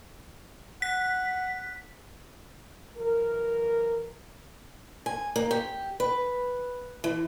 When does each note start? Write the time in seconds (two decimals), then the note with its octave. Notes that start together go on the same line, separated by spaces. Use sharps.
0.82 F#5 B6
2.98 E3 F#3 A#4
5.06 G#5
5.36 A#3
5.51 G4
6.00 B4
7.04 E3